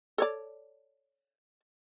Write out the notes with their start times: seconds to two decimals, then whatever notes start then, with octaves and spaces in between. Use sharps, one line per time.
0.18 A4 C#5 D5